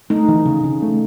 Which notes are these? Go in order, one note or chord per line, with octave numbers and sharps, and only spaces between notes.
A3 D#4
E3
C#3
C#3
A3